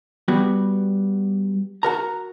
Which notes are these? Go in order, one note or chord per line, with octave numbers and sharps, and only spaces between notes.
G3 B3 F#4
F#4 A#4 A#5